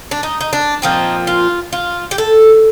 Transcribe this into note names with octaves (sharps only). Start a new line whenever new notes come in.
D4
D#4
D#4
D4
A#2 F3 C4 D#4
F4
F4
G4
A4